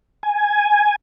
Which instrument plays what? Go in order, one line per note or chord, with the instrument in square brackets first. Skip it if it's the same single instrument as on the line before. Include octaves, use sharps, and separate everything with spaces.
[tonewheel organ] G#5